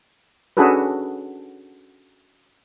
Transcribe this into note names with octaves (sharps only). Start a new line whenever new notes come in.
C#4 D4 F#4 G#4 A4 B4